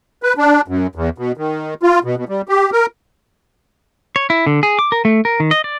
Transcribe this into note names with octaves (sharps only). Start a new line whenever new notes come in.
B4
D4
F#2
E2
B2
D#3
F4
B2
B2
G3
G4
A#4
C#5
E4
D3
G#4
D6
A#4
A3
A#4
D#3
D#5
D5